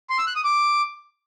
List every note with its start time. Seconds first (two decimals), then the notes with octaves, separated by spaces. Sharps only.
0.10 C6
0.18 E6
0.27 F#6
0.36 D#6
0.44 D6